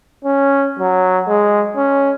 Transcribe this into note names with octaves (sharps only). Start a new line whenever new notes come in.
C#4
F#3
G#3
C#4